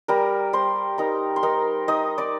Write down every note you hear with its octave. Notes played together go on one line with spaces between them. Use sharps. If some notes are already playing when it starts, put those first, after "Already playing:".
G3 A#4 A#5
G3 C5 C6
D#4 A#4 A#5
C6
D#4 A#4 A#5
D#4 D#5 D#6
D5 D6